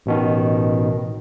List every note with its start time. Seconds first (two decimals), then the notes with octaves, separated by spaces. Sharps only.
0.06 A1 B2 D#3